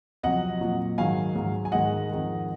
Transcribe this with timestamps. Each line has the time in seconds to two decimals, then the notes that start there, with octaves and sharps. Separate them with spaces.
0.23 F2 C3 F#3 D#5 F#5
0.61 A#2 F#3
0.98 G#2 D#3 F#3 F5 G#5
1.35 G#2 F#3
1.65 G#5
1.72 G#2 D#3 G#3 D#5 F#5
2.10 F2 D#3 G#3